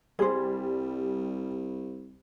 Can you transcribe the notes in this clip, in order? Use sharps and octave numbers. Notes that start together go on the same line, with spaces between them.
C2 G3 G#4 C5